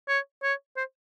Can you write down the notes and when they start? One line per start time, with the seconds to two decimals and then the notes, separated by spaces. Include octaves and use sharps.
0.08 C#5
0.43 C#5
0.76 C5